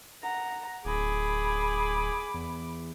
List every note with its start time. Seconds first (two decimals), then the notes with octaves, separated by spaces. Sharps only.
0.22 F#5 A#5
0.85 D1 G#4 B5 D6
2.34 E2